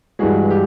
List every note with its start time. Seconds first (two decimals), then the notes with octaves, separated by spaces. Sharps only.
0.19 G2 E3 G#3 F#4 G#4
0.51 G4